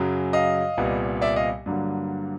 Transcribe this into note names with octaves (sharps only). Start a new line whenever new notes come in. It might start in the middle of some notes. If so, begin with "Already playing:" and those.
Already playing: F#2 C#3 F#3
D#5 F5
C2 A#2 G3 B3
D5 E5
D#5 F5
G2 D3 F#3 A#3